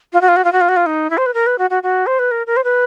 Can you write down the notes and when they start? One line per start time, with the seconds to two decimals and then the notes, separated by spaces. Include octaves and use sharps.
0.13 F4
0.21 F#4
0.28 F4
0.36 F#4
0.44 F4
0.52 F#4
0.61 F4
0.69 F#4
0.76 F4
0.86 D#4
1.10 E4
1.17 C5
1.26 B4
1.34 A#4
1.46 B4
1.58 F#4
1.70 F#4
1.83 F#4
2.07 C5
2.19 B4
2.31 A#4
2.47 A#4
2.57 C5
2.64 B4